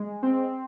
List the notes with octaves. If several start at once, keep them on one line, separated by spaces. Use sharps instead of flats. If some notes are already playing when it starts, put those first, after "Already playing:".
Already playing: G#3
C4